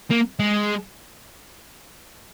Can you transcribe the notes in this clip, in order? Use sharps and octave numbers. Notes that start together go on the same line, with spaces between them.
A#3
G#3